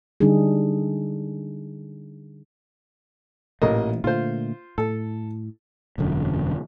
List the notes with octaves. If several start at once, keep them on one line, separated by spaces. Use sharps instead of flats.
D3 G3 D4 D#4 G#4
A1 A#2 E3 A3 A#3 D#5
A#2 D3 A3 F4 C5
A2 A4
E1 F#2 D3